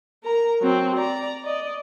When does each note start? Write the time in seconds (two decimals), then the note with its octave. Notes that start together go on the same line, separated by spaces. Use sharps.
0.24 A#4 A#5
0.61 F#3 C4
0.95 D5 A#5
1.44 D5 D#5